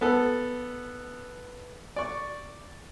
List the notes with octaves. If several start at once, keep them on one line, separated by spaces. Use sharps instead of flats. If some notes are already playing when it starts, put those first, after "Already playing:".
B3 A4
D5 C#6